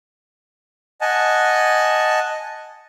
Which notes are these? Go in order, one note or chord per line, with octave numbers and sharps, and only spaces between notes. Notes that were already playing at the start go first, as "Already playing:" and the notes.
D#5 F#5 G#5 A5